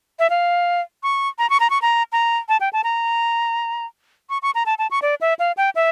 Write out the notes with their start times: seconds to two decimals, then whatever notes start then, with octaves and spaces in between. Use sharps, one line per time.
0.19 E5
0.30 F5
1.03 C#6
1.39 A#5
1.50 C#6
1.60 A#5
1.70 C#6
1.82 A#5
2.12 A#5
2.49 A5
2.61 G5
2.73 A5
2.84 A#5
4.30 C#6
4.42 C#6
4.55 A#5
4.66 A5
4.79 A5
4.91 C#6
5.02 D5
5.21 E5
5.39 F5
5.57 G5
5.75 E5